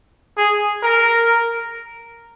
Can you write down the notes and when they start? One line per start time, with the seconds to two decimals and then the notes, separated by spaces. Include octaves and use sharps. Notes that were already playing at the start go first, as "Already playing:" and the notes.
0.37 G#4
0.83 A#4